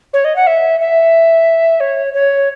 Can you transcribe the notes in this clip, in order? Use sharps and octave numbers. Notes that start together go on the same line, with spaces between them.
C#5
D#5
F#5
E5
E5
C#5
C#5